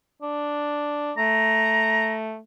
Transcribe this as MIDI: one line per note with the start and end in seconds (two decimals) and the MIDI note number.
0.22 1.13 62
1.18 2.39 57
1.18 2.13 82